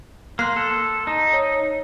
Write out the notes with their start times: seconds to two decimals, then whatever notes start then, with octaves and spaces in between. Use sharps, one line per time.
0.39 A#3 C6 F#6 C7
0.56 A4
1.07 D#4
1.33 C#5